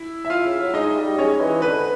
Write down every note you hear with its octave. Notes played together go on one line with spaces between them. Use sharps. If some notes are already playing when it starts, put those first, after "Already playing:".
Already playing: E4
E5
F4 F5
C#3
F#3
G#3 D#4 D#5
G3
G#3 C#4 C#5
E3
D3 B4